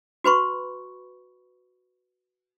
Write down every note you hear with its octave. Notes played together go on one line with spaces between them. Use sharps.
F#4 B4 B5 C#6